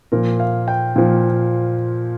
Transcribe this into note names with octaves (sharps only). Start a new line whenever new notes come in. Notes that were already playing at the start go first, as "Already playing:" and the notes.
A#2 F3 A#4
F5
G5
A#2 F3